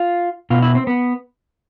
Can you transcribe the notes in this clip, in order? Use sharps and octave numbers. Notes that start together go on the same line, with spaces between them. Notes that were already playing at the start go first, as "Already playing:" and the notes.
Already playing: F4
B2 F4
E4
C4
B3